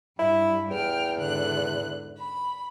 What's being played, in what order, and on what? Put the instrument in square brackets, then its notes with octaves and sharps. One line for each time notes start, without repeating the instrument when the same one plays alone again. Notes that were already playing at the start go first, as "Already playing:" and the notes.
[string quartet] G2 [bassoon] E4
[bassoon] E2 [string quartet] G5 F6
[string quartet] G#2 D3 F#6
B5